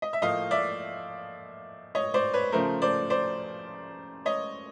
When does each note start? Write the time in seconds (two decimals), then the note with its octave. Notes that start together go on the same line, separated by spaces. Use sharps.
0.02 D#5
0.13 E5
0.22 A2 F3 A#3 D#5 F5
0.51 D5 E5
1.95 C#5 D#5
2.14 C5 D5
2.34 B4 C#5
2.52 C#3 F3 A3 A#4 C5
2.82 C5 D5
3.10 C5 D5
4.25 C#5 D#5